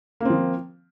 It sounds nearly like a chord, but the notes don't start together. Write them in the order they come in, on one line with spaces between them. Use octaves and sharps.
A#3 C4 F3